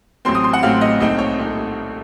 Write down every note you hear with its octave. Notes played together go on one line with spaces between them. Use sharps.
A1 A2 F#3 C4 C6
D#6
C6
F#5
A1 A2 F#3 C4 F5
D#5
C2 A#2 A3 C4 D#4 D#5
C#5
A#2 A3 C4 D#4